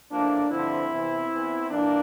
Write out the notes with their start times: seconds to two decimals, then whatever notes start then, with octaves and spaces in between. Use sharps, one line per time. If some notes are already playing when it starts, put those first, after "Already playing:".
0.11 A2 F3 A#3 D4
0.50 G2 D3 F3 C4 E4
0.91 E2 C3 E3
1.30 E2 E3
1.70 G2 E3 A#3 D4